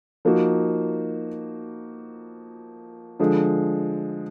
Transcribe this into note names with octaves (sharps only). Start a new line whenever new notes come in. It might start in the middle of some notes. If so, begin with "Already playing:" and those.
F3 A#3 D#4 F#4
D3 F3 G#3